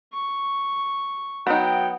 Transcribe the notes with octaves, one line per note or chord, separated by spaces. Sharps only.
C#6
F#3 B3 D#4 G5